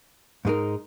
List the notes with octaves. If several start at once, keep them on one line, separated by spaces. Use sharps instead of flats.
G#2 G#3 D#4 A#4